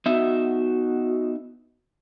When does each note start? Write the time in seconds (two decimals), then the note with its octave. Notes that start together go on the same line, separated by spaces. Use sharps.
0.06 B3 D#4 F#4 E5